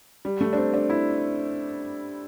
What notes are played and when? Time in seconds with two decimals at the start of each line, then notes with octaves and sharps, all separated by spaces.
0.25 G3
0.41 A3
0.53 D4
0.57 C4
0.74 D4
0.90 E4